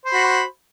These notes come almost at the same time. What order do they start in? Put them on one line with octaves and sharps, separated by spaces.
C5 B5 F#4